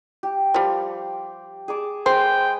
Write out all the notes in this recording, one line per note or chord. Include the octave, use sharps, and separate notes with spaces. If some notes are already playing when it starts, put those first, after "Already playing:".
G4
F3 G3 C6
G#4 A5 D6
G#3 B4 C5 G5